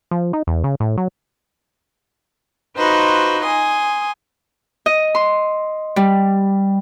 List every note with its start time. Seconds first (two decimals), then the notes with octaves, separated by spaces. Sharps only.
0.11 F3
0.33 D#4
0.47 E2
0.64 C#3
0.80 A2
0.97 F#3
2.77 D#4 F4 F#4 B4 C5
3.45 G#5 C6 D#6
4.86 D#5
5.15 C6
5.96 G3